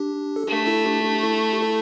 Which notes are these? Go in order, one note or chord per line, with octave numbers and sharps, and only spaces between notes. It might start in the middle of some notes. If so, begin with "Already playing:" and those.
Already playing: D4 G4
A4
A3 D4 G4
E4 A4
D4 G4
D4 G4
E4 A4
G4
E4 A4